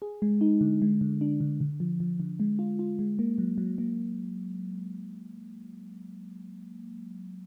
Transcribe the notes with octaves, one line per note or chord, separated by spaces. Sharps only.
G#4
G#3
D#4
D3
G#3
D3
D4
D3
D3
F3
F3
D3
G#3
F4
F4
G#3
A#3
F#3
F#3
A#3